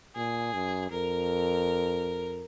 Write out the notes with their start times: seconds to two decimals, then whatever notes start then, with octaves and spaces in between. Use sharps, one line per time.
0.15 A#2 G#4
0.54 F#2
0.91 F2 A#4